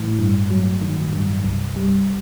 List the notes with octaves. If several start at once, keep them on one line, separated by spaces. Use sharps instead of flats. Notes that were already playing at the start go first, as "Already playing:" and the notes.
Already playing: A2 E3
G2
F#3
D#3
G2
C2
G3